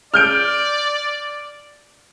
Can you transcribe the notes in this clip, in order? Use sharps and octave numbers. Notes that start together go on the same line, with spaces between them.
D5 F6 G6 D7